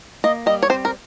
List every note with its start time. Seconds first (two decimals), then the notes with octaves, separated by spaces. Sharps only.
0.24 A#3 D#5
0.46 G3 D#5
0.63 C#5
0.70 C4 C5
0.85 A#4